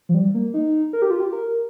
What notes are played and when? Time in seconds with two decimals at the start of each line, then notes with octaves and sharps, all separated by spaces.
0.09 F3
0.14 G3
0.34 A#3
0.54 D#4
0.93 A#4
1.02 G4
1.11 F4
1.20 G4
1.33 A#4